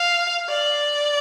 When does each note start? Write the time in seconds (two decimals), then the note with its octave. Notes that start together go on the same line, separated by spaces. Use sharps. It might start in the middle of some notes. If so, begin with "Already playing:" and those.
Already playing: F5
0.49 D5